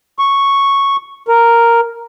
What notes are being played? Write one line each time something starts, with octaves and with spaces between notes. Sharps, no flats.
C#6
A#4